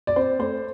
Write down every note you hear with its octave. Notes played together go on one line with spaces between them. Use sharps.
D5
C4 C5
A3 C5